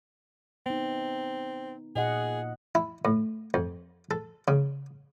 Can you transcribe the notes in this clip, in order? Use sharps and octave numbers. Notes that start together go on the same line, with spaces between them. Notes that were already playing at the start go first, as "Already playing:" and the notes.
B3 C4 D#4
A#2 G#4 D#5 F#5
E4
A2
F2
A4
C#3